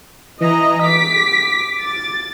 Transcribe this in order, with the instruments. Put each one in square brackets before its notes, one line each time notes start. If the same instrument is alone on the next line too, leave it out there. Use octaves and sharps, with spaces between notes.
[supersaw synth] E3 A#5 [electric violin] D#5
[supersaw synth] D6 [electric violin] B6
[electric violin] A6